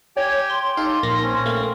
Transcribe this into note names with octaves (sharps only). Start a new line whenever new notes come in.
G4 C#5 G5 G#5
C6
D#4 G4 A4 F5
A#1 A#3 F5 A#6
C4 C#4
A3 A#3 F5